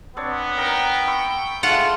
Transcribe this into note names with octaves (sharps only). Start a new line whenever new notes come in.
B3 C4 D4 C#5
D#4 A#4 G5
E5 B5 C#6
G#3 A3 F4 F#5